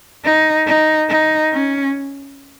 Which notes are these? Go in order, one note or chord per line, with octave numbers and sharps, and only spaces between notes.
D#4
D#4
D#4
C#4